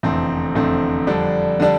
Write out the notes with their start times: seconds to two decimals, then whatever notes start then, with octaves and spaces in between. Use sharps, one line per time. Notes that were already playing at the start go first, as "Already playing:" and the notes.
0.03 F1 E2 D3 A3 C4
0.55 F1 E2 D3 A3 C4
1.07 F2 D3 G3 D4
1.60 D3 G3 D4